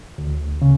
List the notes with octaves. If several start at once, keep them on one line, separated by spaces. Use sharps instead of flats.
D2
C#3